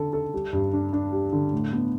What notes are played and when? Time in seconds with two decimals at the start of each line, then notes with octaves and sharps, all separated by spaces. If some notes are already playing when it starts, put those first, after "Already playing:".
Already playing: D3 A4
0.13 A4
0.34 G3
0.53 G2
0.73 D4
0.93 D4
1.12 G3
1.33 D3
1.53 A2
1.73 B3